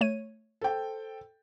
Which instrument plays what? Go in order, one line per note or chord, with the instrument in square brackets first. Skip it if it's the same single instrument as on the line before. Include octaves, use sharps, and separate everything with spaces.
[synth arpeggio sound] A3 C#5 D#7
[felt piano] A4 C5 G5